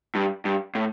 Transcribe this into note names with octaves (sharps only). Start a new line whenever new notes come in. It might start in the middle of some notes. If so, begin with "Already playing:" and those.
G2
G2
A2